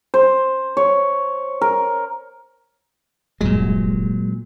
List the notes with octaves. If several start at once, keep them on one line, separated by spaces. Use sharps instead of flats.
C5
C#5
A#4
D1 G1 A#2 F#3 G#3